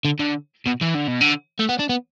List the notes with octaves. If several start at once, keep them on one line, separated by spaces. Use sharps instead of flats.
D3
D3
B2
E3
D3
B2
D3
A3
B3
D4
B3